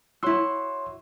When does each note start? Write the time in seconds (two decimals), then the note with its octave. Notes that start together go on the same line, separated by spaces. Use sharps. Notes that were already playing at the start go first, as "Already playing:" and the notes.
0.23 E4 F#4 C#5 C6 E6